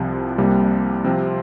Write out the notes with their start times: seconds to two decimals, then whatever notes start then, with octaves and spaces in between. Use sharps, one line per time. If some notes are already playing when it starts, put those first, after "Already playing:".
Already playing: C2 C3 F3
0.38 C2 C3 G3 A#3
1.05 C3 F3 C4 F4